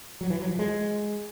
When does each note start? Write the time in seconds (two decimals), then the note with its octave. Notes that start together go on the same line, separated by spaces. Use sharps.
0.21 F#3
0.30 E3
0.40 F#3
0.49 F3
0.59 G#3